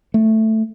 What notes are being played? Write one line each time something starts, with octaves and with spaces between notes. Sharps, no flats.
A3